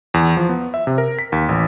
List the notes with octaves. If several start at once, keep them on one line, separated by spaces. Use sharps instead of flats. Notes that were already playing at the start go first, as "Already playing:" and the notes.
E2
F3
B3
E5
C3
A#4
B6
D#2
A1